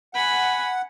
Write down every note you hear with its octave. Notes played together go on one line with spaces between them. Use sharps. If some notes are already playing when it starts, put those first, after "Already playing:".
F#5 G#5 B5